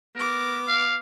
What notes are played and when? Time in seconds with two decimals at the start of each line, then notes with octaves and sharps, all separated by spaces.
0.16 B3 A#4 D6
0.68 F5